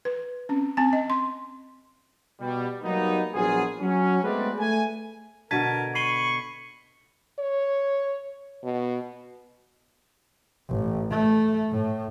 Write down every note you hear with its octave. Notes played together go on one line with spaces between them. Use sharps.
B4
C4 C#4
C4 G#5
D#5
C6
B2 G3
F#3 G3 A#3 B3 D#4
A#1 F#3 B3 F4 G#4
F#3 C#4
G#3 A3 B3 C4 B4 D5
A3 G#5
B2 D3 A#4 A5 G#6 B6 D#7
B5 C#6 C7 D#7 G7
C#5
B2
A1
A3
A2